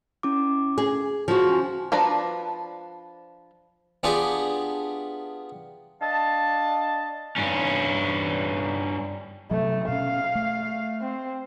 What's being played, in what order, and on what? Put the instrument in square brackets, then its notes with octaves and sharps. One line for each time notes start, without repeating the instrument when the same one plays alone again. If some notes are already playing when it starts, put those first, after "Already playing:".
[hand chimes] C#4 E4 D6
[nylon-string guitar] G#4
F3 F#4
[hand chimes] C#4 G#5
[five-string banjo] F3 D4 B4 D5 A#5
[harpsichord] B3 D4 F4 G4 G#4
[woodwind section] D4 D#5 F5 A5
[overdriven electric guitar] G2 C#4
[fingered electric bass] G2 C3 F#3 [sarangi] A3
[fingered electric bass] B2 C#4 [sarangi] F5
[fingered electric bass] A3
[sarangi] C4